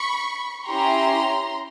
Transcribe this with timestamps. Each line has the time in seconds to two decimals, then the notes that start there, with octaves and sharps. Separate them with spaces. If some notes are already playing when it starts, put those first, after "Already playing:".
Already playing: B5 C#6
0.68 C#4 E4 G4 A#5 C6